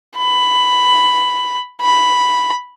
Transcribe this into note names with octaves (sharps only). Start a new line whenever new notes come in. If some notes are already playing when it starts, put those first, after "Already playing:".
B5
B5